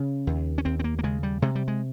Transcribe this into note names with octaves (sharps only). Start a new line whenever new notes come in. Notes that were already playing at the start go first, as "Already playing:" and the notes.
Already playing: C#3 C#4
D#2
C#4
D#2 C4
C4
A#3
A#3
C#3 G#3
G3
C3 G#3
G3
G#3